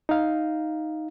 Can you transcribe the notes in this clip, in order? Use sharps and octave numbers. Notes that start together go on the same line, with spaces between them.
D#4 F5